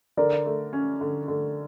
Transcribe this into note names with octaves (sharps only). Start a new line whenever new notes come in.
D3 A#4 D5
A3
C#4
D3
D3